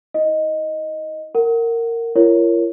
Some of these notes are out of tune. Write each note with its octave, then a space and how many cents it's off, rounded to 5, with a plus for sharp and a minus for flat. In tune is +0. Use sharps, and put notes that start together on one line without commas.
E4 -40 D#5 +0
A#4 -15 F#5 +10
F4 -45 A#4 -5 C#5 +0